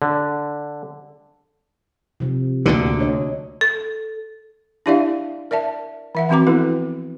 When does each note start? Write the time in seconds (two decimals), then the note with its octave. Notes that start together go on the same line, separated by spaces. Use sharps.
0.02 D3
2.20 C3 F3
2.66 D2 A#2 D3
2.99 D4 C#5 D#5
3.61 A4
4.86 D4 E4 G4 D5 E5 F5
5.51 A#4 D5 E5 A5
6.15 E3 E5 F#5
6.29 E3 F3 C4 F#4 A#5 D6
6.47 B3 E4 A4 B4